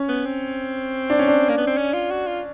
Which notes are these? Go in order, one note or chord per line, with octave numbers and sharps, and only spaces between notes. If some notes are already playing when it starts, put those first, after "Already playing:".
Already playing: C#4
B3
C4
D4
C#4
D4
A#3
B3
C4
C#4
F4
F#4
F4